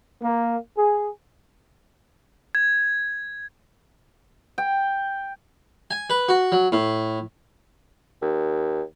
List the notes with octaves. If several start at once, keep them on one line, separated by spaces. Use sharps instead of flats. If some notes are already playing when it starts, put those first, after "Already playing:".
A#3
G#4
G#6
G5
G#5
B4
F#4
F#3
A2
D#2